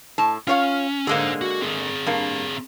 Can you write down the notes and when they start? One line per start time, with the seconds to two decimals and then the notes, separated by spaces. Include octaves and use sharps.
0.18 A2 A5
0.47 C#4 F4 C#5 F5
1.07 D3 G#3 A#3 G#4 C5
1.41 F#4
1.62 C4 G#4
2.07 G2 A#3